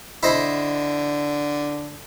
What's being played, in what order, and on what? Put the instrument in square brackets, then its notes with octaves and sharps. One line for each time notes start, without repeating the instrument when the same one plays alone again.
[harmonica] D3 [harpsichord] E4 C5 D#5